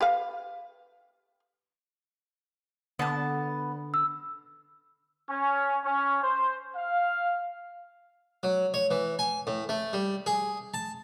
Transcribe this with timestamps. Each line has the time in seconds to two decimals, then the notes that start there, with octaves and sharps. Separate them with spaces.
0.01 G4 B4 F5
2.99 D3 B3 A5
3.94 E6
5.29 C#4
5.85 C#4
6.23 C5
6.75 F5
8.43 F#3
8.74 C#5
8.91 E3
9.19 G#5
9.47 A2
9.69 A3
9.93 G3
10.26 G#4
10.74 A5